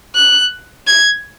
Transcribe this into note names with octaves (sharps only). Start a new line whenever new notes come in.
F#6
G#6